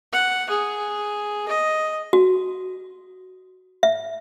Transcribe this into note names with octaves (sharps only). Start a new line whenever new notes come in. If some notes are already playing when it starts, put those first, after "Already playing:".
F#5
G#4
D#5
F#4
E5